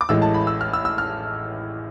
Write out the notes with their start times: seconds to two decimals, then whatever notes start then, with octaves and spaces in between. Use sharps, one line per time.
0.01 D6
0.09 A1 A2 E3 G#3 E6
0.22 A5
0.34 B5
0.47 E6
0.61 F6
0.73 E6
0.85 E6
0.98 F6